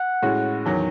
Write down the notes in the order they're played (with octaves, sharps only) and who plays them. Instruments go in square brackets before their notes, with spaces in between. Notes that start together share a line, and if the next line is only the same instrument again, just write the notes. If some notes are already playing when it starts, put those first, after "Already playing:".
Already playing: [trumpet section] F#5
[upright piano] A2 G#3 C#4 F#4
E2 D#3 F#3